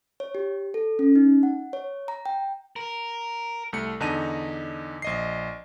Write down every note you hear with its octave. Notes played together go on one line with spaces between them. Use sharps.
C#5
G4
A4
C#4
D#4
F#5
C#5
A#5
G5
A#4
C2 A3 C#7
E2 D3 D#4 A5 A#6 D#7
A#1 D#5 C7